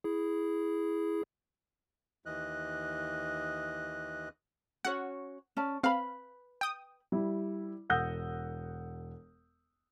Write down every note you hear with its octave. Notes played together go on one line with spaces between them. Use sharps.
E4 G#4
D#2 E3 D#5 F#6
C#4 F#4 C#5 F#5
C#4 D5 A5
C4 B4 F5 B5
G5 D#6
G3 E4
E1 F#5 D#6 E6 G6 A#6